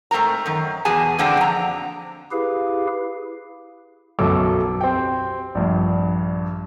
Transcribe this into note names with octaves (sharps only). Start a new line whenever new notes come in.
G#2 A3 C4 A#4 A#5
F#2 D#3
E2 B2 G#4 G#5 A5
D3 A#3 C4 D4 F#5
F2 A#5
E4 G4 G#4 B4 F5
B1 F#2 B2 A4 D6
C4 G4 G5
A#1 G2